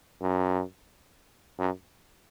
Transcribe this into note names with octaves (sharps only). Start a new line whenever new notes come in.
F#2
F#2